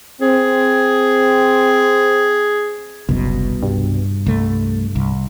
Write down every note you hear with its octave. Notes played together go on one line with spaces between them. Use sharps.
C4 G#4
F#1 C2 B2
G2
C2 A3
C2